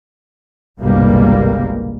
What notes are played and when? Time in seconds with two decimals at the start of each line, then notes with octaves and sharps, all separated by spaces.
0.80 G1 C2 B2 G3 G#3 A#3